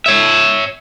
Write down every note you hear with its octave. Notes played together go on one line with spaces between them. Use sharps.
C#5 E5